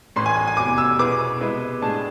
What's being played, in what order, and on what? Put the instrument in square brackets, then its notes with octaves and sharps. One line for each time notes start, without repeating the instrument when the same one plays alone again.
[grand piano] A1 A2 E3 [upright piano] C6
[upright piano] G#5
G#5
G#5
[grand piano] F1 E2 C3 [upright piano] D6
[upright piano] E6
[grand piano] B2 B3 E4 G#4 B4 [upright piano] D6
[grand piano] C3 G#3 B3 E4 B4
[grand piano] A2 G#3 D4 G#4 [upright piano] A5